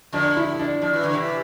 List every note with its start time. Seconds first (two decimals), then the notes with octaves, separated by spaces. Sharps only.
0.12 D3 F3 D4
0.36 E4
0.59 D4
0.82 F3 D4
0.93 E3
1.04 D3
1.14 C3 E3